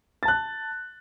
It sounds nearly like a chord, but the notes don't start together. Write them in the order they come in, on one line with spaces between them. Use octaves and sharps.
A6 A5 F#6